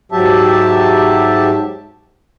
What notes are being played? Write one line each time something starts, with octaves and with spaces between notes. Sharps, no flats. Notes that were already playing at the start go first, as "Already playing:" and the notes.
G#2 F#3 G4 E5 A5